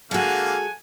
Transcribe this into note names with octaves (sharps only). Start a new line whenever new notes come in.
D3 G#3 A#3 F#4 A4 F5 F#5 G#5